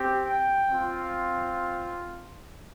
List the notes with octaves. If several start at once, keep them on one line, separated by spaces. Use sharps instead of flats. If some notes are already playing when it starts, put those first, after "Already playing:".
Already playing: C4 G4
G5
C4 F4